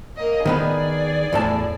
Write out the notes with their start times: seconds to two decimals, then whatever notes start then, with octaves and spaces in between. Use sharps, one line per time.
0.17 A#3 D#5
0.46 D#3 B3 G#4 B4 D5
1.33 E2 A2 A5